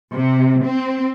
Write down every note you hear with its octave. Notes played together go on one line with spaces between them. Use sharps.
C3
C4